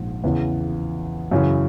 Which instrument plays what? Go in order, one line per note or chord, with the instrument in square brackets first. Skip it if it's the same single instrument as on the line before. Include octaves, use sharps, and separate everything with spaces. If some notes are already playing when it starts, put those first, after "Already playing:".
Already playing: [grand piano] A#1 G#2
E2 C#3 E3
F#2 C#3 E3